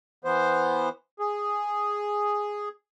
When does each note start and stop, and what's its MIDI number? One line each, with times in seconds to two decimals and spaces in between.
0.24 0.89 52
0.24 0.89 59
0.24 0.89 72
1.19 2.69 68